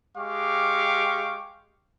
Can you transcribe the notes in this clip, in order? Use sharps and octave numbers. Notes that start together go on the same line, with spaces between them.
G#3 G4 F5 G5 C#6 D6